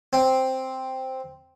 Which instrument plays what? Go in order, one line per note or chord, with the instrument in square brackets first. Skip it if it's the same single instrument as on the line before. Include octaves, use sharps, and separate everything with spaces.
[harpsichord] C4